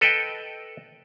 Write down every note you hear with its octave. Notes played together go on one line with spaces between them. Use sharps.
A4 B4 D#5 G5